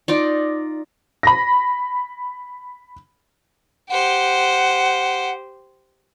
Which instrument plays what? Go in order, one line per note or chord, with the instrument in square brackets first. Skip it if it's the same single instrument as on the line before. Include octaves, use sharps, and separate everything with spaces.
[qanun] D#4 F4 D5
[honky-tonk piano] B5 A#6
[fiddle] G4 C5 [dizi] F#5